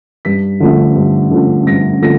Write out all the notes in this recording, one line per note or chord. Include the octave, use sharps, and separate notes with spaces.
G2 B6
D3 F3 A3
G2
D3 F3 A3
G2 A#6
D3 F3 A3 A#6